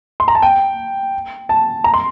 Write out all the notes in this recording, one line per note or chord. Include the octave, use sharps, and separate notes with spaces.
C6
A#5
A5
G5
A5
A#5
C6